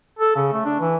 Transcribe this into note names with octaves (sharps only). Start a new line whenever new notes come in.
A4
C#3
A3
D4
E3